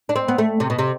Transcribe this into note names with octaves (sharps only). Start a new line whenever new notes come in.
D4
C4
B3
A3
C3
B2
C3